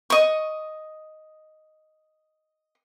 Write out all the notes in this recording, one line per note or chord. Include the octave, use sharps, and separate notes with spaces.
D#5 C#6